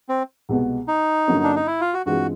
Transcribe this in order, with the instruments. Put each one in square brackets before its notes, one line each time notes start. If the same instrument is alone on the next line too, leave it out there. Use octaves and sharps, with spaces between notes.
[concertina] C4
[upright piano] C2 B2 G#3 B3
[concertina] D#4
[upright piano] G2 D3 F#3 A#3 C#4
[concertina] D4
D#4
E4
F4
F#4
[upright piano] G2 E3 G#3 C4 F4 [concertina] F#4